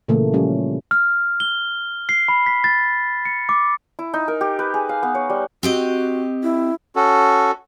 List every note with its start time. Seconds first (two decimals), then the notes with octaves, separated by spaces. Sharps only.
0.08 A#2 C#3 E3 A3 A#3
0.33 F3 G3 C#4
0.91 F6
1.40 G7
2.09 C7
2.28 B5
2.46 B6
2.64 A6
3.25 C#7
3.49 D6
3.99 E4
4.14 D#4
4.28 A#4
4.41 G4
4.59 B4
4.74 G#4
4.89 F5
5.03 B3
5.15 C#5
5.30 G3
5.63 C4 F#4 G4 D#5
6.43 E4
6.96 C#4 F#4 A4